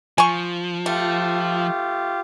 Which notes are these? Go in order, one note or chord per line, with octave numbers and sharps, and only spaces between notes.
F3 G#5 C#6
A3 F4 G4